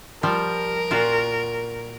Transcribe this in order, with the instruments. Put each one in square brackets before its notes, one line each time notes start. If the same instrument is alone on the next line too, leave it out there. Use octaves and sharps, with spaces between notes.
[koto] F3 G3 [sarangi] A#4
[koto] A#2 F4 F#4